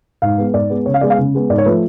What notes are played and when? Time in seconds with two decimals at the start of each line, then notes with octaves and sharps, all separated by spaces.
0.22 G#2 F5
0.38 G#3 B3
0.53 G#2 D5
0.70 G#3 B3
0.86 C#3 C#5
0.94 F5
1.01 G#3 B3 D5
1.10 F5
1.18 C#3
1.35 G#3 B3
1.49 G#2 D5
1.58 C#5
1.66 F3 A3 B4